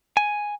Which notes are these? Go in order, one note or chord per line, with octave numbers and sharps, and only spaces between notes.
G#5